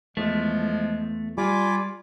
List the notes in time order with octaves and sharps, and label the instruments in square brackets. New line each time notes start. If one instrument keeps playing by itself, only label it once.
[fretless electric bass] E2 [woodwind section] F3 G#3 [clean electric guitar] A3
[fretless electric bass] G3 [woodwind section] F4 [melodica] G#5 B5 D6